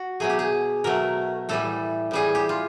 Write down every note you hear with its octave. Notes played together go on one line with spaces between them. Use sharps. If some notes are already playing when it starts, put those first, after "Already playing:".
Already playing: F#4
B2 F#3 A3 G#4
G4
G#4
B2 F#3 A3 A#4
A2 E3 G3 A4
A2 E3 G3 G#4
G4
F4